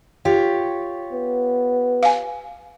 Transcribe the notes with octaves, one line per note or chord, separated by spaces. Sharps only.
F4 G4 C#5
B3
F5 G#5